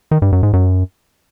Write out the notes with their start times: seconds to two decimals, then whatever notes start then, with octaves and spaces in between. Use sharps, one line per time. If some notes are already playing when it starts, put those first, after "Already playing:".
0.11 D#3
0.22 G2
0.32 F#2
0.43 G#2
0.53 F#2